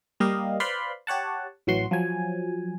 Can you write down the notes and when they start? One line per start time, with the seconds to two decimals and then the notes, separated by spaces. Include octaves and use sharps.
0.20 G3 A#3 G4 D#5 F5
0.60 B4 C5 D5 F5 B5 C6
1.07 G4 C#5 F#5 A5
1.67 A1 E3 F#3 F#4 C6 C#6
1.91 F3 F#3 G#5